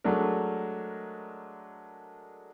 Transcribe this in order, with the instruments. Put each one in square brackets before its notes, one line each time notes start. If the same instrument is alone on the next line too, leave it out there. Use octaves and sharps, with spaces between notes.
[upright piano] F#3 G#3 A3 D4 A#4